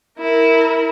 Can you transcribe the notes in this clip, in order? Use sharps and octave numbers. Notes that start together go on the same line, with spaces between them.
E4 A#4